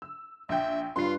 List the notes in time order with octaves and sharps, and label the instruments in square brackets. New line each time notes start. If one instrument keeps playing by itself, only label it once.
[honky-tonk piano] E6
[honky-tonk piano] A#1 G5 [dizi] E5
[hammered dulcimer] G2 B4 [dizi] F4 [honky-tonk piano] C6 C7